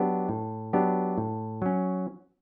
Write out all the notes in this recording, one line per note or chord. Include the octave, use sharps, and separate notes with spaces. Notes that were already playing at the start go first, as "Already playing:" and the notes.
Already playing: F#3 B3 D4 G4
A2
F#3 B3 D4 G4
A2
F#3 C#4